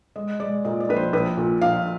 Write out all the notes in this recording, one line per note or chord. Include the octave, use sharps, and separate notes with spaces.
G#3 D#5
G#3 D5
A#2 D#5
D5
A#1 B4
C5
A#1 B4
A#2
A#1 F5